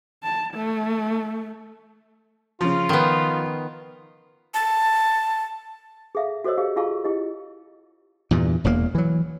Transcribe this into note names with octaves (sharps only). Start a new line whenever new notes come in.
A5
A3
C#3 F3 F4
D#3 B3
A5
G#4 A4 E5 F5
F#4 A4 C5 C#5 D#5 E6
G4 G#4 F5
F4 G#4 F5 A5 C#6
E4 G4 D#5
E2 G2 A#2
E1 E2 E3 A#3
E3 F#3